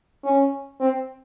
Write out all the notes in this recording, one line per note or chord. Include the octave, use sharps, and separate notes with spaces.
C#4
C4